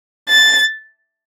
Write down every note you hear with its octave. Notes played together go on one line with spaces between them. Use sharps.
A6